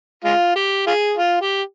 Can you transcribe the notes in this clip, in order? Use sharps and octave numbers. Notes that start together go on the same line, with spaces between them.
G#3 F4
G4
F4 G#4
F4
G4